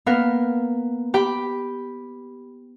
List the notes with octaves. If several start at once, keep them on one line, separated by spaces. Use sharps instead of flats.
A#3 B3 A#4
G4 G5 B5